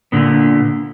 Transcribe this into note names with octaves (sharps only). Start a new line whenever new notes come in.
A#2 D3 B3